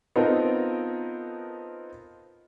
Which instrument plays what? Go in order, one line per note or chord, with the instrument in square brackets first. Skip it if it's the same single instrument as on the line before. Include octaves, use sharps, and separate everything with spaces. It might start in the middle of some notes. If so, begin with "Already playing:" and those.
[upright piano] B3 C4 D#4 F4 A4 A#4